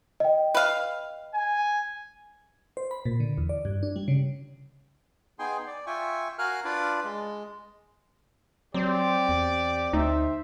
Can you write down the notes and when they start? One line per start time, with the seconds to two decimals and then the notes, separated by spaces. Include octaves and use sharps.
0.20 D#5 G5
0.55 B4 F5
1.34 G#5
2.77 C5
2.91 B5
3.05 A#2
3.20 D3
3.38 E2
3.49 D5
3.65 G2
3.83 D4
3.96 G3
4.08 C#3
5.39 B3 D#4 G#4 G5 G#5 C6
5.67 D5
5.87 F4 E5 G5 G#5 C#6
6.38 F#4 A#4 F5 G#5 F6 F#6
6.64 D4 F4 B4 D5
7.04 G#3
8.74 F#3 C4 G4 D5
9.29 E2
9.93 D2 D#4 C5 E5